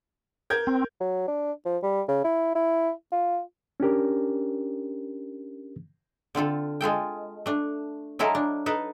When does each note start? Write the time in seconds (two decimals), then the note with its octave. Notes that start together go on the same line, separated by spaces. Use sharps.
0.50 A#4 G6 G#6
0.67 C4
1.01 F#3
1.28 D4
1.65 F3
1.83 G3
2.08 C#3
2.24 E4
2.55 E4
3.12 F4
3.80 C#4 D4 G4 A#4
6.35 D3 C4 F4 A4
6.81 G#3 F4 A4 G5
7.46 A3 D4
8.19 F#3 G#3 E4 A4 A#4
8.35 D4
8.66 D#4 A4 B4